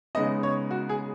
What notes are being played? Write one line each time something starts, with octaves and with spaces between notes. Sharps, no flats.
C#3 G#3 B3 D#4 D#5
C#5
F#4
G#4